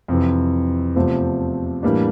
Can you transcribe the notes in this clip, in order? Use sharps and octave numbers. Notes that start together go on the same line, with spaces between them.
F2 C3 E3
E2 C3 F3 A3 C4
A2 E3 G3 A#3 D4